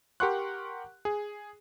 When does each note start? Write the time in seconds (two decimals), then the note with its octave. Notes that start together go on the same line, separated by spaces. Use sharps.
0.20 G4 A#4 F#5 C6 C#6 F#6
1.05 G#4